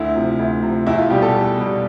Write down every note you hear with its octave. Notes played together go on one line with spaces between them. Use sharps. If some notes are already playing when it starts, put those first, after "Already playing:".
Already playing: D2 E4
C3 F3
D2
C3 F3
E2 E4
F4
B2 G3 G4
A4
E2
B2 G3